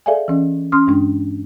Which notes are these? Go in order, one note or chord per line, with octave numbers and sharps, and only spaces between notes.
G#4 A4 D5 E5 F5 G#5
E3 C#4
C#4 C6 D#6 F6
G2 G#3 D4